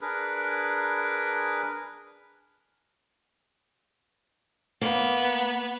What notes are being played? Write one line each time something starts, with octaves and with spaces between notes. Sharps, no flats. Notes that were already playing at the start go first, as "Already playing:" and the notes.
D4 G#4 A#4 B4
A#3 B3